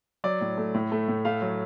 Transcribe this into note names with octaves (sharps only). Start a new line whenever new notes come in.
F#3 D5
A2
A3
A2
A3
A2
A3 F5
F#3